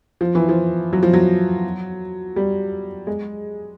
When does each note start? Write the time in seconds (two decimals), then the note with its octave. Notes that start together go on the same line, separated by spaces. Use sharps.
0.21 F3
0.35 E3
0.49 F3
0.93 F#3
1.03 F3
1.14 F#3
2.36 G3
3.07 G#3